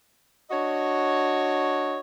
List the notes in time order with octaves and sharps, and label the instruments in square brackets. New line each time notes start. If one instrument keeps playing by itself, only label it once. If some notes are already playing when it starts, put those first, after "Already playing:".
[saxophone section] D4 F#4 C#5 D#5